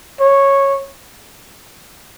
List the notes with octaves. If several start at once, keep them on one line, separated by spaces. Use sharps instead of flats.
C#5